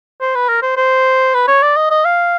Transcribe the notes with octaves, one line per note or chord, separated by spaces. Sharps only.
C5
B4
A#4
C5
C5
B4
C#5
D5
D#5
D#5
F5